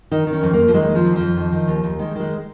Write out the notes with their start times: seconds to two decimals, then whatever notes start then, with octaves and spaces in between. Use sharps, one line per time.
0.11 D#3 D#4
0.27 D#3
0.33 C#4
0.43 F2
0.53 F2 A#3
0.68 F3
0.74 D#3 G#3
0.90 D#3
0.95 F3
1.05 F2
1.16 F2 F3
1.36 D#3
1.52 D#3
1.68 D#2
1.84 D#2
1.99 D#3 G#3
2.15 D#3 G#3